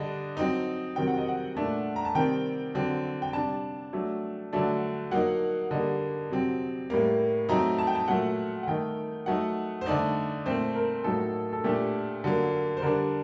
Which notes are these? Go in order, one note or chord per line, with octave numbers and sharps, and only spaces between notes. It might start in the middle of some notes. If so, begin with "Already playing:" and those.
Already playing: D3 G3 D4 D#5
F#3 C4 D#4
C3 D#3 F#3 C4 G5
F#5
D#5
F#5
A#2 A3 D4
A#5
A5
C3 D#3 G3 C4 G5
D3 F#3 C4
G5
C3 G3 D4 A5
F#3 A3 D4
D3 F#3 A3 D4
F#3 A#3 D#4 F#5
D3 G3 A#3 D#5
C3 F#3 C4
A2 G3 A#3
F#3 A3 C4 D#4 A#5
A5
G5
A5
A#2 F#3 A3 F#5
F#5
D#3 A3 D#4 G5
F#3 A3 D#4 F#5
C5
D3 A3 D#4 D5
A#2 A3 C4 C5
A#4
A2 F#3 A#3 D#4 A4
A4
A#2 A3 D4 G4
D3 F#3 A#3
C5
D3 G3 D4 A#4